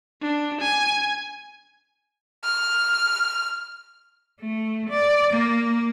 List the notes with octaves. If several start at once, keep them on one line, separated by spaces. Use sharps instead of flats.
D4
G#5
F6
A3
D5
A#3